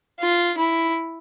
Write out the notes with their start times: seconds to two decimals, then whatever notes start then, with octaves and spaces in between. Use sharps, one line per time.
0.20 F4
0.58 E4